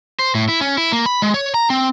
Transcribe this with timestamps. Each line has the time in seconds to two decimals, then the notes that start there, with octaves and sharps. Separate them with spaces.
0.19 C5
0.35 A2
0.49 E4
0.61 C#4
0.78 E4
0.92 A#3
1.06 B5
1.22 G#3
1.34 C#5
1.54 A#5
1.70 C4